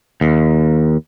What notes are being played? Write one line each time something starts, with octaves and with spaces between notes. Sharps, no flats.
D#2